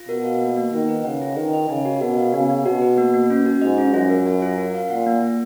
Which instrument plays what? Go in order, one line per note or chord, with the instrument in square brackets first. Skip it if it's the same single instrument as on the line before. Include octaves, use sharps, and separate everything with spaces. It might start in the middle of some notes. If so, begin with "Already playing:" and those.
Already playing: [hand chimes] F4
[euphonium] B2 [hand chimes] A#4
[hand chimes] F5
A#3
A#3
[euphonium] D#3 [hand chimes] F4
[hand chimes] B4
[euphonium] C#3 [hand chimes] F#5
[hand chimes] F4
[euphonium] D#3 [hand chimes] B4
[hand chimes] D#5
[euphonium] C#3 [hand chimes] G#5
[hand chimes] F#4
[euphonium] B2 [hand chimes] A#4
[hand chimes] F5
[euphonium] C#3 [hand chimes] B3
[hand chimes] B3
[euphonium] B2 [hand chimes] F#4
[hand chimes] B4
A#3
A#3
C#4
F#4
[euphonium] G#2 [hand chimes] D#5
[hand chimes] C#4
[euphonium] F#2 [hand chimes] F4
[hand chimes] A#4
G#5
F4
A#4
F5
[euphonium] A#2 [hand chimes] F#5
[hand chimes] A#3
F4